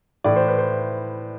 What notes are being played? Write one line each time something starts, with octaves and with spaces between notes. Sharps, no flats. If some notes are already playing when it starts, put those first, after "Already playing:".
A2 E3 D5
C5
B4
C5